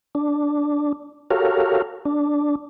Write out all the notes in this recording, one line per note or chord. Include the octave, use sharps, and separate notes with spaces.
D4
F#4 G4 A4 A#4 C#5 F5
D4